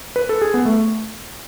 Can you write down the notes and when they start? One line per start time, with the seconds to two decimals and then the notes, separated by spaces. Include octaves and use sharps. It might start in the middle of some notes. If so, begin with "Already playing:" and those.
0.16 B4
0.29 A4
0.42 G#4
0.54 B3
0.65 A3